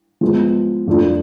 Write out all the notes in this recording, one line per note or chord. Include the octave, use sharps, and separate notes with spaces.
F3 G#3 B3
F2 F3 A3 D4 F4